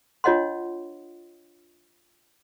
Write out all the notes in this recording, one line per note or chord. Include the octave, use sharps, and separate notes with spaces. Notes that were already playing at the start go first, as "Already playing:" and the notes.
D4 F4 C#5 D#5 F#5 C6